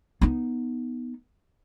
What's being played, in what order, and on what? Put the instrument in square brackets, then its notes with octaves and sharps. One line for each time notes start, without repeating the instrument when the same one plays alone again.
[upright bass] B3 D#4